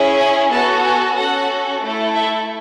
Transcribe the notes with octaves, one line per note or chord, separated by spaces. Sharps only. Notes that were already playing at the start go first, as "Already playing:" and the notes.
Already playing: C#4 E4 G#4
G#5
B3 F#4 A4 A5
G#5
C#4 F#4 A4 F#5
A3 E4 A4
E5